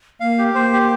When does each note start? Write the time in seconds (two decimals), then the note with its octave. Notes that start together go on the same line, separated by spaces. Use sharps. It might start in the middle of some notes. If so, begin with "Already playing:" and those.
0.20 A#3 F5
0.38 G4
0.55 A#3 C5
0.73 G4